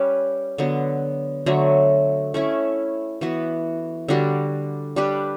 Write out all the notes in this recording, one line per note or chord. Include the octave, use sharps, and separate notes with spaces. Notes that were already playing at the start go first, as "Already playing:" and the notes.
Already playing: G3 C#4 G4 B4
D3 F#3 B3
D3 F#3 A3
A3 C#4 E4
E3 B3 F#4 B4
D3 G3 D4 F#4
G3 D4 G4 B4